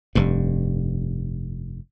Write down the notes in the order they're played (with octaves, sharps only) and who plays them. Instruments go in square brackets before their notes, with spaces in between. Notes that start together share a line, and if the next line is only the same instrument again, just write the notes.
[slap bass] F1 G2